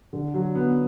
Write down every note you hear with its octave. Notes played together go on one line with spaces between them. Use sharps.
D3
F#3
B3